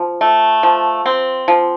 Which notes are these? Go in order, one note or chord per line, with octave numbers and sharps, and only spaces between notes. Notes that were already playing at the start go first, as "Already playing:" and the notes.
Already playing: F3
A3
F3
C4
F3